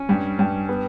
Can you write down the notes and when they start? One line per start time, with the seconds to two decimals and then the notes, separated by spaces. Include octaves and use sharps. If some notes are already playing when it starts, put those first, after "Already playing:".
Already playing: C#4
0.09 G2
0.39 G2
0.69 B3